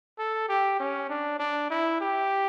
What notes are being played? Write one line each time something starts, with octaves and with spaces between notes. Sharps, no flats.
A4
G4
C#4
D4
D4
E4
G4